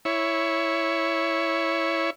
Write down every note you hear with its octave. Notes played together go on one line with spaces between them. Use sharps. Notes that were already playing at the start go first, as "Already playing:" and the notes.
E4 C#5